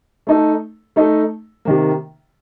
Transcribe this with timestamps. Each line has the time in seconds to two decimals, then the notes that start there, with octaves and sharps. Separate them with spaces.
0.27 A3 D#4 A4
0.96 A3 D#4 A4 D#5
1.65 C3 D#3 A#3